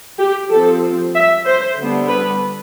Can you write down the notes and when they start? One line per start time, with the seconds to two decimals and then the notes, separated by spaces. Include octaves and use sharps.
0.19 G4
0.51 F3 C4 A4
1.15 E5
1.45 C5
1.77 D3 G3 B3 D4
2.09 B4